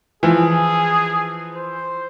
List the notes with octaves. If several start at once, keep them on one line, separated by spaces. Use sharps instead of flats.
E3 F3 G#4
C5